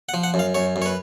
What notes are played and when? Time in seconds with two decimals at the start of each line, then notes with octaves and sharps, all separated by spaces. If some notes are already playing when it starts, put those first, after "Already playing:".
0.09 F#5
0.14 F3
0.23 F#5
0.34 F#2
0.39 F5
0.55 F#2 C#5
0.76 F#2
0.82 C#5
0.86 B4